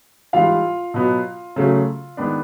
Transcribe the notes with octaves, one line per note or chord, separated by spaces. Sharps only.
G#2 E3 G3 F4 F5
B2 F#3 B3
C#3 F#3 A3
D#3 G#3 B3 D4